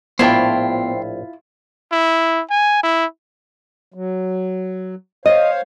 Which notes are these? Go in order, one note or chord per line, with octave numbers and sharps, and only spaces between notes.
A#1 A2 B3 E4 F4 C5 G5
E4
G#5
E4
F#3
C5 C#5 D#5 F5